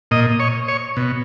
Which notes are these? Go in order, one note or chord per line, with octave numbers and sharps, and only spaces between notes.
A#2 D#5
C#5
C#5
B2